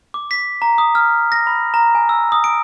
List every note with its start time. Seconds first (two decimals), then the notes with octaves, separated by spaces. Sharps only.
0.14 D6
0.31 B6
0.62 A#5
0.78 D#6
0.95 F6
1.32 A#6
1.47 B5
1.74 A#5
1.95 G#5
2.09 E6
2.32 D#6
2.44 D7